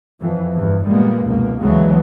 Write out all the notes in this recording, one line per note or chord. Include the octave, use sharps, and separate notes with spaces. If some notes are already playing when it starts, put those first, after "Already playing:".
F2 E3
G1 E2 G2
A#2 G3 G#3 A#3 B3
F1 C#2 F#2 B2 A#3
D2 C#3 E3 F#3 G#3 B3